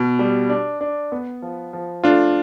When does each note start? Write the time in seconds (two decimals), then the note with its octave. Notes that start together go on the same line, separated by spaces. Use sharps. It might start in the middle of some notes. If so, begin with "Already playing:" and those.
Already playing: B2
0.19 G3
0.49 D4
0.81 D4
1.12 B3
1.42 F3
1.73 F3
2.04 A3 D4 F4